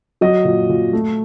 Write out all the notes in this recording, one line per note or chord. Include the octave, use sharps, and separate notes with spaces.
F#3 D#5
A#2
A#2
A3